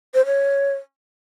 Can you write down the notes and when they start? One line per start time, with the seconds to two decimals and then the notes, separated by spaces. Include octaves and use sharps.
0.14 C5
0.26 C#5